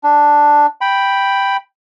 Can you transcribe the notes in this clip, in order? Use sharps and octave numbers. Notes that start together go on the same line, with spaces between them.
D4
G5 B5